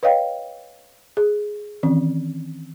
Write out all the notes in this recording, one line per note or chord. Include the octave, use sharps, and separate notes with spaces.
B4 C#5 D#5 F5 G5
G#4
D#3 E3 C4 C#4